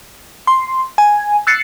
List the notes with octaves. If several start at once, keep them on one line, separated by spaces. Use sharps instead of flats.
C6
G#5
E6 F#6 A6 C7 C#7